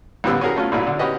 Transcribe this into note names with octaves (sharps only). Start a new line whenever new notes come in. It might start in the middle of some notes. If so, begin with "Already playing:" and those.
A#1 A2 D3 G3 B3 E6
C#4 F#4 G#4 A#4
A3 C#4 F4
A1 A#2 F#3 E4
D3
C#4 F#4 G4 B4 D#5